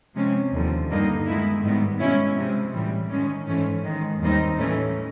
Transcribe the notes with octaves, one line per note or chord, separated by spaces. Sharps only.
C3 F3 G#3 C#4
D#2 D3 F3
G2 D3 G3 A#3 D#4
D#3 G#3 B3 E4
G#2 D#3 G3 B3
B2 G#3 C#4 E4
C3 F3 G#3
A2 E3 G3
D#3 G#3 C#4
G#2 E3 A3 C#4
G#2 D#3 G#3
D#2 D#3 G3 C4 D#4
A2 E3 A3 C#4